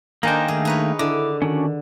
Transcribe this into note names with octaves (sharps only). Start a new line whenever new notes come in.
D#3 A#3 D4 D#4 C5 G5 G#5 A#5
D#3 A3 A#3 G#4
D#4 B4 C#5
D3 E4 D6
D#3 C#4 D4 F#4